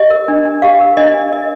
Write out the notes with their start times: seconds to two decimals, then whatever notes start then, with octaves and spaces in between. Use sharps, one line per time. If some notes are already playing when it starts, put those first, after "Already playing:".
Already playing: G4 D#5
0.10 A#4
0.28 D4
0.45 D4
0.62 G4 F5
0.81 A#4
0.97 D4 D#5
1.14 D4
1.32 A#4 D#5